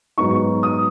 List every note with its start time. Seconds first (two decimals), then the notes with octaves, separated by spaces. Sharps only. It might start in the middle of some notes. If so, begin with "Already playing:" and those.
0.18 G#2 F#3 B3 D#4 C#6
0.63 D#6